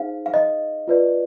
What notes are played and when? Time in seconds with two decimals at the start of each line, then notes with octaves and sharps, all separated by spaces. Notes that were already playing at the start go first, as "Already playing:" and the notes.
Already playing: D#4 G#4 C5 F5
0.26 F5
0.34 D#5
0.88 F4 B4 D5